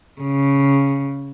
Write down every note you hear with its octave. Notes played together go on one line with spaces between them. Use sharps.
C#3